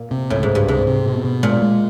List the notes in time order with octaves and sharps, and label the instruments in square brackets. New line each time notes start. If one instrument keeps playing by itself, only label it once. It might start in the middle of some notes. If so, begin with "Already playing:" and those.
Already playing: [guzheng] A#2
[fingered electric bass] C3
[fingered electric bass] C#2 [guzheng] A2
[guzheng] G#2
[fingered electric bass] C#2
[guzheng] G2
[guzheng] G#2 [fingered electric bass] C3
[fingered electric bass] C3
B2
B2
[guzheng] A#2 [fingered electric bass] G#3
[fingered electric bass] G#3